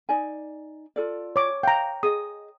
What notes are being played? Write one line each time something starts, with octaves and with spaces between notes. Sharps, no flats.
D#4 D5 G#5
F4 A4 D5
C#5 D6
F5 G5 A#5
G#4 D#5 D#6